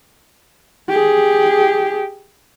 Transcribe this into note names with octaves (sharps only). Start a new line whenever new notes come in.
G4 G#4